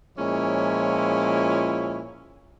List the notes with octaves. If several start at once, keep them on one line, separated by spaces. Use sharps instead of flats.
A#2 F3 G#3 C#4 E4 C#5